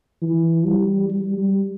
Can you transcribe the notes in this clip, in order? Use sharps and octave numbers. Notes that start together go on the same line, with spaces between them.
E3
G3
G3
G3